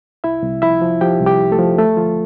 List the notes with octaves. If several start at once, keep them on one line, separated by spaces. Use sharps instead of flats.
C2 E4 E5
C2
F3 E4 E5
F3
F3 G4 G5
C2
G4 G5
C3
A3 A4
F3
D2 A3 A4
D2 F3 F4